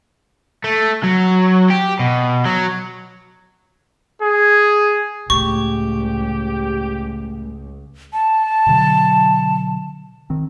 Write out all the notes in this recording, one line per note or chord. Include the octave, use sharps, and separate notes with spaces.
A3
F#3
G4
B2
F#3
G#4
C#2 A2 G4 C#6
A5
B2 D3 F#3
D#3 C4